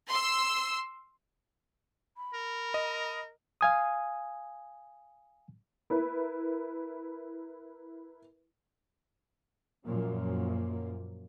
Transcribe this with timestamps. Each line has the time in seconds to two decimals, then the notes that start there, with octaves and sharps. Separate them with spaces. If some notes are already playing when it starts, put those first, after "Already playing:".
0.10 C6 E6
2.17 B5
2.34 A#4
2.74 D#5
3.61 F5 G#5 D#6
5.90 E4 A#4 B4
9.85 F#2 A#2 F3 A#3